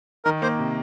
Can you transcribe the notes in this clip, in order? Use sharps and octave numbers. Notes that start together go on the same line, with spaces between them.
D#3 A#4
A#3 C5
C3